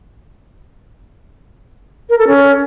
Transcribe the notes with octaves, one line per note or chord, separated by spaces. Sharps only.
A#4
A4
C#4